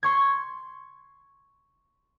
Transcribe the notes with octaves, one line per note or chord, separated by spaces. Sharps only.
C6 C#6 G#6